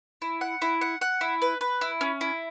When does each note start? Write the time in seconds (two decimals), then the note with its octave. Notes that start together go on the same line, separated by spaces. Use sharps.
0.22 E4
0.41 F#5
0.62 E4
0.81 F#5
1.01 F#5
1.21 E4
1.42 B4
1.61 B4
1.81 E4
2.01 C#4
2.21 E4